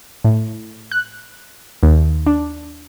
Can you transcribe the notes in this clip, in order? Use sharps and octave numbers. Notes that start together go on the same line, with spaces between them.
A2
F#6
D#2
D4